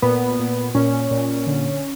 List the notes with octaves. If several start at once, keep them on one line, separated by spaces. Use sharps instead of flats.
A#2 B3
A#2
A#2 C#4
A#2
D3